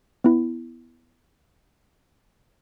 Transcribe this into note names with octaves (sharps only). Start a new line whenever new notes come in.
B3 E4